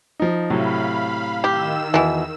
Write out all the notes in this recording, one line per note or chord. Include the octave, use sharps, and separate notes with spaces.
F3 D#4
A2 C3 F#3 F5 B5
D#3 G4 E6 E7
E2 B2 E3